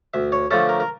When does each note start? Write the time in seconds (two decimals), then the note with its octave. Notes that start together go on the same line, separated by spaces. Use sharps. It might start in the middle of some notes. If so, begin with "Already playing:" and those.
0.14 D2 E5
0.32 C#5
0.51 D3 F3 A3 C#4 A4
0.69 A#4
0.80 A#4